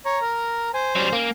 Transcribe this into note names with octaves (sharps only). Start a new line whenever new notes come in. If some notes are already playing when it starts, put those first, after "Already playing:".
C#5 A#5
A#4
C5 G#5
F#3 G3 C#4
A#3